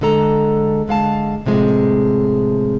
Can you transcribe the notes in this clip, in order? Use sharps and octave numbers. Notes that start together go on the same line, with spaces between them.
D3 G#3 A4 A#5
D3 G#3 F5 A5
A2 C3 F3 G#3